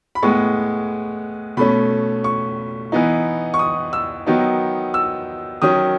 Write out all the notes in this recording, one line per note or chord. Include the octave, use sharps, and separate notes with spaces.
B5
A2 G#3 B3 C#6
B2 A3 C#4 B5
C#6
E3 B3 D#4
C#6
D#6
E6
D#3 F#3 B3 D#4
E6
D#3 F#3 C#4 D#6